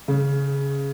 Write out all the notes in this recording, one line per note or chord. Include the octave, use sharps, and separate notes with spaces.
C#3